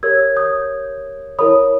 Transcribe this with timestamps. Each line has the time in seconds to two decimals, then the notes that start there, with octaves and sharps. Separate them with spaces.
0.03 G4 A#4 C#5 E6 G#6
0.37 D#6 G6
1.39 E4 A#4 C#5 B5 D#6